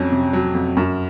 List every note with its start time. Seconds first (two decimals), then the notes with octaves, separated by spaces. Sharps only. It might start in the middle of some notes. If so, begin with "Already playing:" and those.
Already playing: F2 F#3 C#4
0.11 C3
0.33 F#3
0.55 F2
0.77 F#2